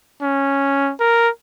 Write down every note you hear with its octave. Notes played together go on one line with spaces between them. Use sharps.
C#4
A#4